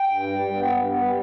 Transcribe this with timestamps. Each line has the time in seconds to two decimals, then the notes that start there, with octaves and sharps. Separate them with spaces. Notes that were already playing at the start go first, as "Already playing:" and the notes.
Already playing: G5
0.09 G2
0.23 G3
0.39 G2
0.54 B3
0.70 G2
0.85 B3
1.01 G3